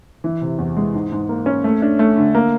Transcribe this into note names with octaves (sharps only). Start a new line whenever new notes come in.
E3
C3
E2
G#3
G#2
G#2
A#3
C#4
A3
D4
A3
D3
A#3